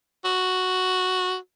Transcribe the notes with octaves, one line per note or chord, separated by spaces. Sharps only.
F#4